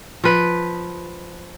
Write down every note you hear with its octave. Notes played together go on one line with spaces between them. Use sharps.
F3 B4